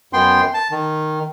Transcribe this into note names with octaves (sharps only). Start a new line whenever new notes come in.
F#2 B3 G5 C6
A5
D#3